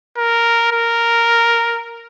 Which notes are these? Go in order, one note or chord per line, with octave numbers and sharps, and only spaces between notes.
A#4
A#4